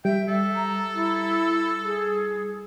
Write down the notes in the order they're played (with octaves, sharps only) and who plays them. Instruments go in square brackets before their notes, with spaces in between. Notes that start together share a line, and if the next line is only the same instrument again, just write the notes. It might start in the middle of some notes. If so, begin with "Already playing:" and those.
[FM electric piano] G3 [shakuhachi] E5 [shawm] G5
[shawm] A4 [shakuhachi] E5
[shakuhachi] A#5
E4
G#4